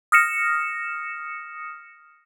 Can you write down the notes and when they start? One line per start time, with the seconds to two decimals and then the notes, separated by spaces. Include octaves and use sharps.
0.12 D#6 F6 A#6 C#7 E7